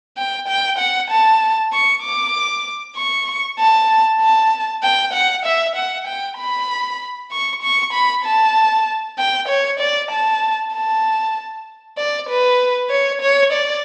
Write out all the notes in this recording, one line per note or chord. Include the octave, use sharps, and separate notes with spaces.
G5
G5
F#5
A5
C#6
D6
C#6
A5
A5
G5
F#5
E5
F#5
G5
B5
C#6
C#6
B5
A5
G5
C#5
D5
A5
A5
D5
B4
C#5
C#5
D5